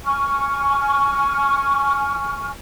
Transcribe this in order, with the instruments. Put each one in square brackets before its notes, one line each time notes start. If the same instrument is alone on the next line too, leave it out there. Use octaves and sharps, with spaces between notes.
[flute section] G#5 C#6 F6